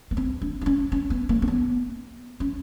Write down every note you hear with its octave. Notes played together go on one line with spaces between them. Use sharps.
B3
C4
D4
D4
C#4
C#4
B3
A#3
C4
B3
C#4